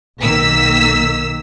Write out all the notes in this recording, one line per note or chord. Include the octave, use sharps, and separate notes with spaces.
B1 D#3 A#3 E6 B6